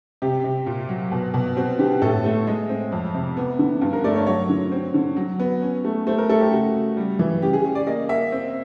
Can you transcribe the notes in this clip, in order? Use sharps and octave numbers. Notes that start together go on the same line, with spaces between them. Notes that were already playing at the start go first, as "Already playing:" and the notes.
C3 G4
C3
A#2
F#3
B2
B2
C4 F#4
D3 G4
A2 A4
A3
G#3
C4
F2
C3
B3
D3
G2
A#4
A3 D5
C#5
F#3 C#5
D3
C4
D3
F#3
B3
C#4
A3
A3 C5
A#4
A3 A4
G4
C#3 F#4
C#3
G3
E3
C#3 G4
G#4
C#4
D5
A#3 D#5
A#3 E5
C4